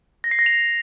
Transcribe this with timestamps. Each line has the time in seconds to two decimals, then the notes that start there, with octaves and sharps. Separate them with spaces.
0.24 A#6
0.31 C7
0.39 A#6
0.46 F7